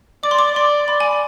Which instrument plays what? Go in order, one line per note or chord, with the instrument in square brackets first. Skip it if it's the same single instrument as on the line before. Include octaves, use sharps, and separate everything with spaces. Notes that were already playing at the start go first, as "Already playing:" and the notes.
[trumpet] D5 [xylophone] D6
[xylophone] C6
D6
[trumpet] D5 [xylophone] C6
[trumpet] D5 [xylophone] B5
[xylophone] G#5